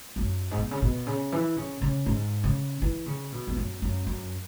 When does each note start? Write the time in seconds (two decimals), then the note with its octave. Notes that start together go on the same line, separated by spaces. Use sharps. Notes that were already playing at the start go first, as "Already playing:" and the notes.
0.16 E2
0.19 F#2
0.51 G#2
0.57 B2
0.71 C#3
0.82 B2
1.07 C#3
1.32 E3
1.57 C#3
1.82 C#3
2.06 G#2
2.44 C#3
2.82 E3
3.06 C#3
3.32 B2
3.47 E2
3.57 F#2
3.82 F#2
4.07 F#2